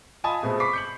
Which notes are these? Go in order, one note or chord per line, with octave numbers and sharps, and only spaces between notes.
F4 D#5 G#5 A5 B5 D#6
B2 G#3 A3 B3 C4
B5 C#6 D6 B6 C7
G6 C#7 F#7